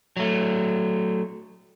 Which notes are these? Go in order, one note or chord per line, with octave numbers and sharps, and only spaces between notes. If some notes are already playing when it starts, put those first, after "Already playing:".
F#3 A3